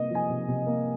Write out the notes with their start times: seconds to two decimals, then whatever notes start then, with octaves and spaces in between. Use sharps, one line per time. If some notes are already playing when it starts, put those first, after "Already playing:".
Already playing: C3 A#3 D#5
0.10 F3 G#5
0.29 C3
0.48 C3
0.67 A#3